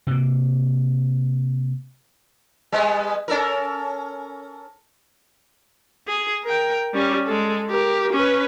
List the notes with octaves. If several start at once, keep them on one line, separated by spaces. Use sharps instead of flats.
C3 A#3
G3 G#3 B3
C#4 A4 A#4
G#4
A#4 G5
G3 C#4
G#3 A4
G4 A#4
C#4 B4